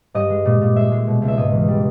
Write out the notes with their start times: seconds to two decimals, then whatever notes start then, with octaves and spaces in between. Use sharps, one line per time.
0.14 G2 D#5
0.30 G#3
0.45 A#2
0.61 A#2
0.76 G#3 E5
0.92 G#3
1.07 B2
1.22 C#2
1.28 E5
1.37 G#2 D#5
1.53 E3
1.68 G3